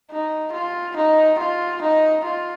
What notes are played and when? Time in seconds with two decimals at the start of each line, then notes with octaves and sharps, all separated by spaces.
0.11 D#4
0.53 F4
0.97 D#4
1.39 F4
1.82 D#4
2.24 F4